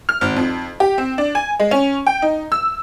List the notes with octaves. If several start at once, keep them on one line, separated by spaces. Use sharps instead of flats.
F6
G#1
F2
G4
C4
D4
G#5
G#3
C#4
G5
D#4
E6